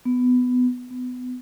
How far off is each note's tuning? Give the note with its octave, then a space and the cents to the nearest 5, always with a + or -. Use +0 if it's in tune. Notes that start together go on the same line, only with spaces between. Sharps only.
B3 +15
B3 +25